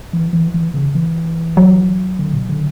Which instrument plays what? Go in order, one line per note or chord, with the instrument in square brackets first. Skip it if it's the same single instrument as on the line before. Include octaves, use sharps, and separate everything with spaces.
[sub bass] E3
E3
E3
C#3
E3
[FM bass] F#3
[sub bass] D3
B2
D3